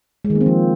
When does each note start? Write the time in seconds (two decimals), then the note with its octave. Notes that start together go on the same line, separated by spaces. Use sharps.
0.25 G#3
0.30 D#3
0.35 A#3
0.41 C4
0.46 F3